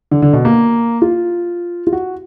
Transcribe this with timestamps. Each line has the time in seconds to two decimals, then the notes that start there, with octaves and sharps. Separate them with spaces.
0.11 D3
0.22 D3
0.33 B2
0.45 A#3
1.02 F4
1.87 F4
1.93 F#4